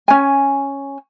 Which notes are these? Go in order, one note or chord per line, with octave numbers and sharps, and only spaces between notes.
C#4 G#5